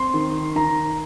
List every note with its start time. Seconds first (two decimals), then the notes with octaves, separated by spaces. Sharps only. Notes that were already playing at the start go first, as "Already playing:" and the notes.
Already playing: C4 C6
0.14 D#3
0.55 D#3 A#5